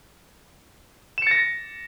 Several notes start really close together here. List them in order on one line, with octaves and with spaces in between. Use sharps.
E7 C#7 A6 A#6